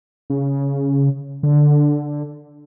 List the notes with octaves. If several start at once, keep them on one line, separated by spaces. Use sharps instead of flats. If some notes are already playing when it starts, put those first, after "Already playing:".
C#3
D3